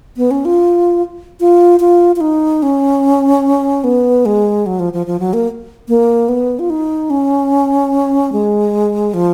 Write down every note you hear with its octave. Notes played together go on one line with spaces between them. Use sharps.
B3
C#4
F4
F4
F4
F4
D#4
C#4
B3
G#3
F#3
F3
F3
F3
F#3
A#3
A#3
B3
F4
D#4
C#4
G#3
F3